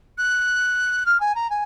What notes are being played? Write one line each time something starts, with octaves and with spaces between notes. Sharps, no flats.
F#6
F6
G#5
A#5
G#5